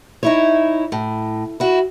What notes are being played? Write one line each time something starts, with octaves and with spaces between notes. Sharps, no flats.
D#4 E4 C#5
A2
E4 F#4